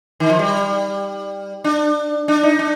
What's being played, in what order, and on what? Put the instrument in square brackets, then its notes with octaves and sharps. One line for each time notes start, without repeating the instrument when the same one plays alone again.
[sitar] D#3
F3
G3
D4
D4
D#4
D4